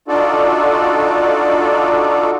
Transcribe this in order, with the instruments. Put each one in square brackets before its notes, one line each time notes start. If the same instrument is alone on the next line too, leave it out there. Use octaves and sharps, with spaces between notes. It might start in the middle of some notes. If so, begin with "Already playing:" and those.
[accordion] D4 D#4 F4 F#4 A4 D5